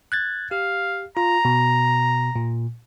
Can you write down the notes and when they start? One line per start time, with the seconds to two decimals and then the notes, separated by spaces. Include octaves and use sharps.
0.12 F#6 G#6 A6
0.51 G4 F5
1.17 F4 A#5
1.45 B2
2.36 A#2